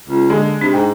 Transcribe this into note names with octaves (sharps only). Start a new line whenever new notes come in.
C#2
D3 G#3
C3 D4
G#2 G5